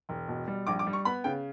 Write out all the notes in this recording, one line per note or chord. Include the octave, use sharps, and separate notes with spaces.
E1
B2
G3
A#1 D6
D6
G3
C#6
B3 B5
C#3 G5